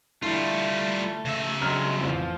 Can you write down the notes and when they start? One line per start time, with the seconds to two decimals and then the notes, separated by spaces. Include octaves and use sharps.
0.22 D3 G3 A3 E4 F4
1.25 C#3 E5
1.61 F#3 G#3 D4 A#5 F6
2.01 A1 F2 F3